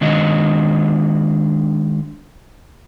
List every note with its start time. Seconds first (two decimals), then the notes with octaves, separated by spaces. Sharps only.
0.01 D#3 G#3 D4 F#4 D#5